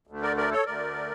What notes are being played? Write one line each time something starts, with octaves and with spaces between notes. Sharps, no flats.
D2 D3 A3
A#4 D5
A#4 D5
A4 C#5
D2 D3 A3 A#4 D5